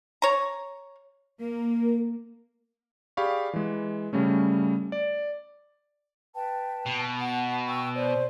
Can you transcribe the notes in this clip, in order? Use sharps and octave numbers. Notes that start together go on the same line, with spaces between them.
C#5 A#5
A#3 A#4
G4 G#4 D5 F5 B5 C#6
E3 G#3
C#3 G3 A3 C#4
D5
B4 G5 A5
B2
F#5
G5 C#6 E6
C5 D5